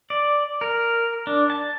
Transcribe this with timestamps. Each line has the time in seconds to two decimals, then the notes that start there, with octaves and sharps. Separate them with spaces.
0.10 D5
0.61 A#4
1.27 D4
1.50 A5